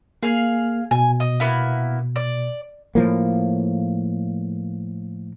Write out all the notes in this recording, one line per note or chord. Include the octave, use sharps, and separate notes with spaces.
A#3 G#4 F5
B2 G#5
D#5
A#3 B3 E4
D5
A2 F3 A#3